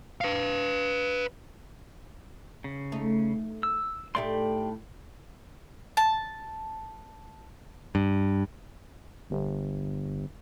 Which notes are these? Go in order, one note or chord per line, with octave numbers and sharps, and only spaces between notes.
B4 F5
C#3
A3 D#4
E6
A2 A3 D#4 G4 D5 C6
A5
G2
G1